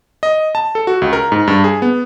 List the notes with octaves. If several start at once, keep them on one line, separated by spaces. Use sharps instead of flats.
D#5
A5
A4
F#4
C#2
A#4
G#2
G2
G#4
B3